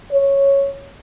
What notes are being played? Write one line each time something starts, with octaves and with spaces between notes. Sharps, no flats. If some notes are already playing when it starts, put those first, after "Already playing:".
C#5